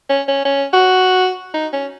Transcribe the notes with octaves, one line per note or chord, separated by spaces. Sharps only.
C#4
C#4
C#4
F#4
D#4
C#4